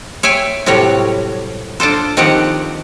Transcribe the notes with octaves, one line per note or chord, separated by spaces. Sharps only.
C#5 E5 G5 G#5
A2 C3 F#3 G3 C#5
D4 F4 A4 C5
D#3 F3 C4 G4 F#5